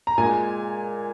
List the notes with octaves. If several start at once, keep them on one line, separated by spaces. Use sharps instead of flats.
A#5
A#2 G#3 G#5